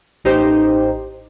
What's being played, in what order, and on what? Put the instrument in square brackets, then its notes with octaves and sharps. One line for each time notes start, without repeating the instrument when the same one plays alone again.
[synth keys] A1 D#4 G4 C5